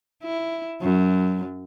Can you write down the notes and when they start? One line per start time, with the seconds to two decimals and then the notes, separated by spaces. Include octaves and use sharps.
0.24 E4
0.82 F#2